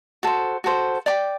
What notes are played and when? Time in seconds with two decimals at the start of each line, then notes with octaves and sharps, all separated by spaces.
0.23 F#4 A4 C5
0.64 F#4 A4 C5
1.06 D5 G5 D6